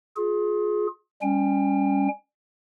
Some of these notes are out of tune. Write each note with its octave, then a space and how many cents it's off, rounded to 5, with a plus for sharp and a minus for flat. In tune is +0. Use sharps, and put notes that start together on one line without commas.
F4 +30 G#4 +20
G3 +30 C#4 +5 G5 +30